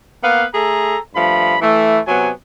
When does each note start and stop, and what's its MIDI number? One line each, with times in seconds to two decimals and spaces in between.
0.22 0.45 58
0.22 0.45 59
0.22 0.45 71
0.22 0.45 77
0.54 0.97 57
0.54 0.97 68
0.54 0.97 69
0.54 0.97 82
1.14 1.57 43
1.14 1.57 53
1.14 1.57 57
1.14 1.57 83
1.61 1.99 52
1.61 1.99 57
2.07 2.29 48
2.07 2.29 54
2.07 2.29 59
2.07 2.29 80